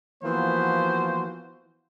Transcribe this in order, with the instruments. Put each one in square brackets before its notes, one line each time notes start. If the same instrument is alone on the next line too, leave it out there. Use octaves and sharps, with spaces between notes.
[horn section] E3 F3 A#3 B3 F#4 C5